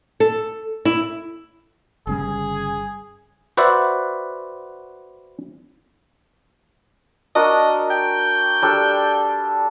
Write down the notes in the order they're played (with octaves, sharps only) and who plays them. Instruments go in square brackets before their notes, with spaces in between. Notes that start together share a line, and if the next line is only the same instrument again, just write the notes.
[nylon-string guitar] A4
E4
[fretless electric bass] G1 C#3 G3 [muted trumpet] G#4
[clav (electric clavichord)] F#4 B4 C5 D5 E5 F#5
[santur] D4 F#4 A#4 [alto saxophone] D#5
[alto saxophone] G5
[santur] G3 D4 A4